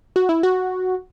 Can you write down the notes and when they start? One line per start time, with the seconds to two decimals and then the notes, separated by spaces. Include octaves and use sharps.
0.16 F#4
0.29 E4
0.43 F#4